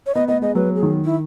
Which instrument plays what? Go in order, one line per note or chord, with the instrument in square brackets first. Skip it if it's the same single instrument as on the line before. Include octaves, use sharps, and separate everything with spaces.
[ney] C#5
[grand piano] B3 [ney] D#5
[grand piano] B3 [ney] D#5
[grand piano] G#3 [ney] D#5
[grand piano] F#3 [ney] B4
[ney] G#4
[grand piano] D#3
[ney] E4